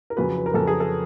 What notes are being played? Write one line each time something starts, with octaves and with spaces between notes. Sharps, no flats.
A#4
F2 C#3 F#3 B4
B4
A#4
F2 C#3 F#3 A4
G#4
A4